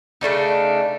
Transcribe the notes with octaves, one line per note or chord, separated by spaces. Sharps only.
C#3 A3 D4 D#4